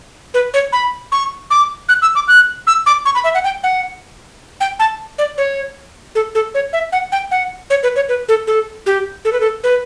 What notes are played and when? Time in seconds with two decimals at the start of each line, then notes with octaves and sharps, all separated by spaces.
0.34 B4
0.54 C#5
0.73 B5
1.12 C#6
1.50 D6
1.89 F#6
2.02 E6
2.15 D6
2.28 F#6
2.67 E6
2.86 D6
3.05 C#6
3.15 B5
3.24 E5
3.34 F#5
3.44 G5
3.63 F#5
4.61 G5
4.79 A5
5.18 D5
5.38 C#5
6.15 A4
6.35 A4
6.54 C#5
6.73 E5
6.92 F#5
7.12 G5
7.31 F#5
7.70 C#5
7.83 B4
7.96 C#5
8.09 B4
8.28 A4
8.47 A4
8.86 G4
9.25 A4
9.33 B4
9.40 A4
9.64 B4